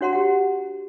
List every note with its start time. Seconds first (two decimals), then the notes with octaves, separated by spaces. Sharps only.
0.01 D4 F#4 C#5 F#5 A#5 C6
0.13 G4 F#5